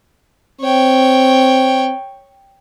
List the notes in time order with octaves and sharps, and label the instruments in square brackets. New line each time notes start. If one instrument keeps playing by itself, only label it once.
[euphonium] C4 [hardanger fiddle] C#5 G5